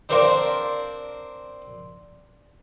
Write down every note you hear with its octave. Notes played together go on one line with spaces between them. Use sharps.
C4 D4 A#4 C5 D5 F5